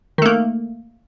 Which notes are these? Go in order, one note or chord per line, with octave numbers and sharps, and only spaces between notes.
D#3 A3 A#3